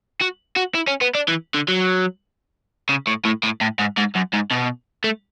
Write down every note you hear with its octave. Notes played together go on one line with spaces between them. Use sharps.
F#4
F#4
E4
C#4
B3
D4
E3
D3
F#3
C#3
A2
A2
A2
A2
G#2
G#2
F#2
G#2
B2
A3